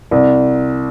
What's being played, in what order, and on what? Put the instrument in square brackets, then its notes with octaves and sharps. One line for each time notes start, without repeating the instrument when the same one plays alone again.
[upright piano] C2